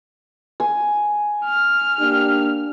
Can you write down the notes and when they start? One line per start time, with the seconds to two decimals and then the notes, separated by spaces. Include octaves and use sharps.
0.60 G#5
1.45 F6
2.01 A#3 D4 G4